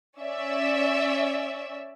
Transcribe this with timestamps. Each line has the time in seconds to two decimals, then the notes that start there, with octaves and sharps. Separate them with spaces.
0.18 C#4 D5 E5